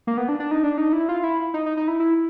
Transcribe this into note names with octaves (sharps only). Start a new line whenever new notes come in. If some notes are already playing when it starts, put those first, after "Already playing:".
A#3
B3
D4
D4
D#4
D4
D#4
E4
F4
E4
D#4
D#4
D#4
E4
E4